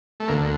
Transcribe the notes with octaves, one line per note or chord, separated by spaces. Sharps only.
A3
D2 A#3